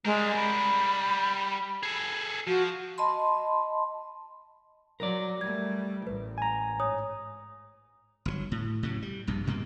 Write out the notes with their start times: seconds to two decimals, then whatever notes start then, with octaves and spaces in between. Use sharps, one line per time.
0.05 G3 G#3 A#4
0.36 B5
1.83 G#4 A4
2.47 F3 F#4
2.98 D#5 A5 B5 C6
5.00 F#3 A#4 D5
5.41 G3 A3 G#6
6.07 A1 B4
6.38 G#5 A#5
6.80 G#2 C#5 D#6
8.25 G1 D3 F#3
8.52 A2
8.83 A2 C#3 F#3
9.02 G3
9.27 A#1 G2 B2
9.46 D2 G2 B2 A#3